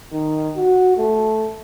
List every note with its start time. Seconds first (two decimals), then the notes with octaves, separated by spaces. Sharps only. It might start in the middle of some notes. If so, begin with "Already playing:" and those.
0.12 D#3
0.57 F#4
0.97 A3